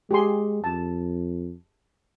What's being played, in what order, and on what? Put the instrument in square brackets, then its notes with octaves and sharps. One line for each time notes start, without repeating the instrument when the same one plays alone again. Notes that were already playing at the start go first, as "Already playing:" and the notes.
[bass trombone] G#3 [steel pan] G4 G#4 C6
[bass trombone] F2 [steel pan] A5